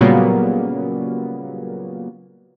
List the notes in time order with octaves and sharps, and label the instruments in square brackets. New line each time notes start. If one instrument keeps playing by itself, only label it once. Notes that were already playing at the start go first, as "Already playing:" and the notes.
[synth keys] A#2 C#3 F#3 G3 A#3 B3